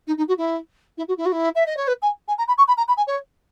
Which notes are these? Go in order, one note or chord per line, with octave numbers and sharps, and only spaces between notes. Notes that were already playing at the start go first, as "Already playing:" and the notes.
D#4
D#4
F#4
E4
E4
F#4
E4
F#4
E4
E5
D#5
C#5
B4
G#5
G#5
A#5
B5
C#6
B5
A#5
B5
G#5
C#5